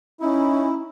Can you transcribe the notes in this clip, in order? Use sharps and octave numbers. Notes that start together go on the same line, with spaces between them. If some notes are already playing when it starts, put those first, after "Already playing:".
C#4 D#4 E4